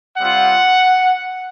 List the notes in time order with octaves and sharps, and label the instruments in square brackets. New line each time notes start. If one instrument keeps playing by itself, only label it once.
[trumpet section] G3 C4 F4 F#5